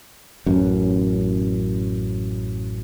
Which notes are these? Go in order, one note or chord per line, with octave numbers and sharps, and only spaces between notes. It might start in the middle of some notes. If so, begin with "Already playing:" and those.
A1 F#2